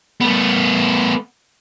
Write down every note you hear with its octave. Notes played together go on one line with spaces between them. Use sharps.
A3 B3